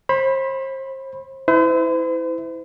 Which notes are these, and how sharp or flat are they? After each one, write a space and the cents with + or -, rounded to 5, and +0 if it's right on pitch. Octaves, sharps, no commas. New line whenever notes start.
C5 +35 B5 +0
E4 -15 C5 -45